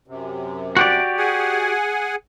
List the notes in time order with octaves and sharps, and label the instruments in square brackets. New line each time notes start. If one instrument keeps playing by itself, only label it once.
[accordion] F#2 C3
[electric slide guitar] F#4 G4 D5
[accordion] G#4 F#5 G#5